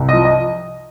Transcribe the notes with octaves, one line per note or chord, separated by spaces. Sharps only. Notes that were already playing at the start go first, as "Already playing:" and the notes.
Already playing: C2
F3 D#5
D#5